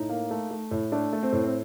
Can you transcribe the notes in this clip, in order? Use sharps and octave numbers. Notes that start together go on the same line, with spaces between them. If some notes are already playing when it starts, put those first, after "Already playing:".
Already playing: A2 D#4
A#3
A3
A3
A2
A3 D4
A3
C4
A2
C4